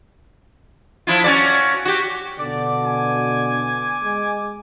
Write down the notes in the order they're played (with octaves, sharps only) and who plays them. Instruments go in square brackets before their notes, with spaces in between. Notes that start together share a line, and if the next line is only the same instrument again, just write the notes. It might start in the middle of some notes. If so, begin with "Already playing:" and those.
[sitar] F3 E4 F4
C#4 F#4 D5
F#4 G4
[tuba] B2 [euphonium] D3 [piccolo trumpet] D5 [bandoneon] D6
[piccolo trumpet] G#5
[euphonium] G#3